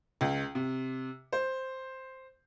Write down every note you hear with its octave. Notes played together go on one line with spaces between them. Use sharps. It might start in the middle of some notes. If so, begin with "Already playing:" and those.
C#2
C3
C5